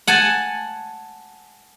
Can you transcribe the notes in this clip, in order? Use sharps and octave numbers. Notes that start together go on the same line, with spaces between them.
F#5 G#5 A5